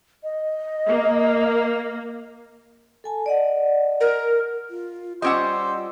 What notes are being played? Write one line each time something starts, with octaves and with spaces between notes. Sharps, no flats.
D#5
A#3
A4 G#5 A5
D5 D#5 F#5
A#4
F4
G3 C#4 F4 C5 D#5 F#5 D6 E6